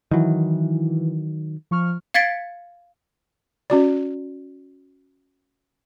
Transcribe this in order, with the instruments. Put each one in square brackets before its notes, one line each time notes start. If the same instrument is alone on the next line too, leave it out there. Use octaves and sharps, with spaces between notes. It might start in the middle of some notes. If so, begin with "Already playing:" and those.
[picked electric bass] D#3 F#3 [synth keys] E3 E4
[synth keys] F3 C#6 F6
[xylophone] F5 G#6 A6 B6 C#7 D7
[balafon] C#4 F#4 D5